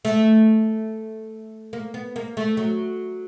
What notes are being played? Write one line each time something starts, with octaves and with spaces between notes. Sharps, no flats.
A3
A#3
B3
A#3
A3
F#3